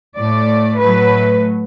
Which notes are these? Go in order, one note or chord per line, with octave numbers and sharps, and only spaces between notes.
A2 A3 D5
A2 F#3 A3 B4